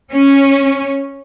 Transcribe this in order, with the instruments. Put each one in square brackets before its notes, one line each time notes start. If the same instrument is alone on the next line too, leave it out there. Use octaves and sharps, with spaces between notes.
[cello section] C#4